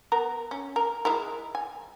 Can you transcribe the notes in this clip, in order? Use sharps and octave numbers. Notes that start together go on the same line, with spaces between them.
B3 A#4 A#5
C#4
A#4
G#3 E4 A#4
G#5